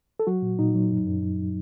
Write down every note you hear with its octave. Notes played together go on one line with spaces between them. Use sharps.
A4
F#3 F#4
A#2
A#2 D#4
F#3
F#2
F#2
F#2